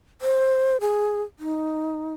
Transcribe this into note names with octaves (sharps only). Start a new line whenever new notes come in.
C5
G#4
D#4